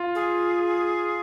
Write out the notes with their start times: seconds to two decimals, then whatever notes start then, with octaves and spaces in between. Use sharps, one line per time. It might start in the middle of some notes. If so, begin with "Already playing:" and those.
Already playing: F4
0.15 G#4